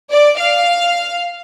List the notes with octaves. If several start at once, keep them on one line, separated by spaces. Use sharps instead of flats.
D5
F5